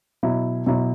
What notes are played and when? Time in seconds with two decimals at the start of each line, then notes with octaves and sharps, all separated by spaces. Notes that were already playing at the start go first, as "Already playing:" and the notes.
0.23 B2 F#3 E4
0.66 B2 F#3 E4